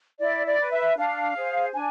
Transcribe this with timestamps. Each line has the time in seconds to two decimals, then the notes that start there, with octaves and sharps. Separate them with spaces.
0.20 E4 D5
0.46 D5
0.59 B4
0.71 E5
0.97 D4 F5
1.36 G#4 C5
1.74 D4 G#5